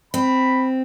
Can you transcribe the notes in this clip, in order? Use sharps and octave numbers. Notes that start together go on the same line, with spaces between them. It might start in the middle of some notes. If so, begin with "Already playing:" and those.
C4 B5